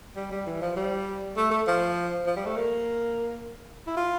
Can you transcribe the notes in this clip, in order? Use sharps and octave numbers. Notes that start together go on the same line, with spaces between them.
G3
G3
E3
F3
G3
A3
A3
F3
F3
G3
A3
A#3
E4
F4